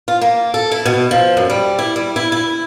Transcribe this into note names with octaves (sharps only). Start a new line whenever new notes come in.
F4
A#3
A4
E4
B2
F3
F#2
G3
E4
G3
E4
E4